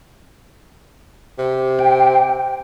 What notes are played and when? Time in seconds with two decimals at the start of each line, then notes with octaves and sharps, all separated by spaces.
1.39 C3
1.79 G5